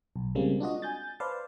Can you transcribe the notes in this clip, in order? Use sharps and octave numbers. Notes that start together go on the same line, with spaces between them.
B1
C#3 G3 G#3 A#3 C4
D4 F4 F#4 D#5
G#5 G6 A6
B4 C5 D5 F5 A5